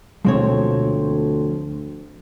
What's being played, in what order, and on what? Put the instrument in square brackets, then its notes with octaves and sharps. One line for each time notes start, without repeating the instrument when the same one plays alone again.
[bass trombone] D2 [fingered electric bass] B2 G#3 [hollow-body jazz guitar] F3 C4 C#5